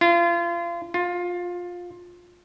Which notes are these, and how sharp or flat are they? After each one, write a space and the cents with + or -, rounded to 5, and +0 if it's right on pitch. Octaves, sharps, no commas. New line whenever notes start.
F4 -30
F4 +20